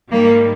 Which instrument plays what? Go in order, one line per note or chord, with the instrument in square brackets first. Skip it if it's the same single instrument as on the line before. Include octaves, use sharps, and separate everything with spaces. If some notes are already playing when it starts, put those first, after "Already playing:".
[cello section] G#2 D#3 G3 A#3